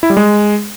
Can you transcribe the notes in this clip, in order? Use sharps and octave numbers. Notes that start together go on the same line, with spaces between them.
E4
G3
G#3